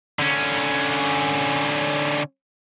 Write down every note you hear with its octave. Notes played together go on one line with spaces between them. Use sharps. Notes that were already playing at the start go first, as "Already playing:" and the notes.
D3 C#4